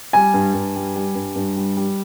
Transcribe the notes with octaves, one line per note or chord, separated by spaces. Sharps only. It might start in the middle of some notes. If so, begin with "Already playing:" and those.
G3 G#5
G2
G2
G3
G3
G2
G2
G3
G3